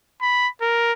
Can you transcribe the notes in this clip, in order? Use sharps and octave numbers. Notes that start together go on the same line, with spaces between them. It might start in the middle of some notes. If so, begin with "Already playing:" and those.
B5
A#4